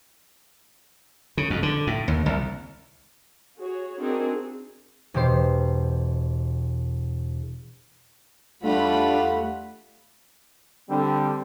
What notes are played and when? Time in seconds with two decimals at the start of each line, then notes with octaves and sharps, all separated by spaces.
1.37 C#3
1.50 F2
1.63 D3
1.87 A2
2.08 D#2
2.26 C2
3.58 F#4 G#4 C#5
4.00 C4 D4 D#4 F#4 G#4 A#4
5.14 E1 B2 G4 C5 C7
8.64 E2 G3 A3 D4 F4 F#5 B5
10.90 D3 G3 C4